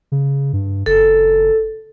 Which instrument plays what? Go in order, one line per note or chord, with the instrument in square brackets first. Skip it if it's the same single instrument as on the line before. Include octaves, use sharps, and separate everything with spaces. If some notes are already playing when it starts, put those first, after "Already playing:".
[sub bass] C#3
G2
[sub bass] F#1 [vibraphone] A4